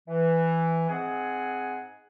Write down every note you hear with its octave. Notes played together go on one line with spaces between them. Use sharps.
E3
G#2 C4 G#4 F#5 G#5